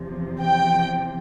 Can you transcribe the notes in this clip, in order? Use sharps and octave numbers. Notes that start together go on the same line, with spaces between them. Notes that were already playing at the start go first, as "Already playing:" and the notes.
Already playing: E2 C3 F3
G5